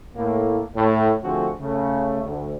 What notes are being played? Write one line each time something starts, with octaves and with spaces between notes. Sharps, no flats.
A2 A#3
A2
D3 F3 A3 C4 F#4 G#4
C#3 A3
D2